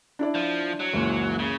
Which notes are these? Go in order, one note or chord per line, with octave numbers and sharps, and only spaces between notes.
D4 E4 D5
F3
F#3
F#1 C#2 E3
C#3